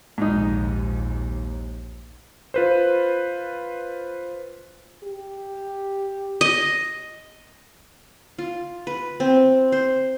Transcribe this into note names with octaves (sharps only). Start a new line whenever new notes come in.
A#1 D#2 G#2 D#4
F4 B4 C5
G4
D#5
F4
B4
C4
C5